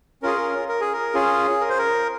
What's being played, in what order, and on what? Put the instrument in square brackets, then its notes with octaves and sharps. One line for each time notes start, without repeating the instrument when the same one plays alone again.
[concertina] C#4 F4 G#4 A#4
A#4
A#4
G#4
A#4
C#4 F4 G#4
A#4
C5
A#4